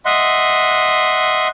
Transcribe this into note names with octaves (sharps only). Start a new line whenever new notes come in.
D#5 E5 F#5 C6